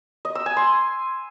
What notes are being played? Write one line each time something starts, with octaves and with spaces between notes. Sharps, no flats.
D#5
E6
G#5
C6